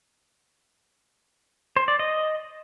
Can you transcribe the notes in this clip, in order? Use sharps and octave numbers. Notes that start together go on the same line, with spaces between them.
C5
D5
D#5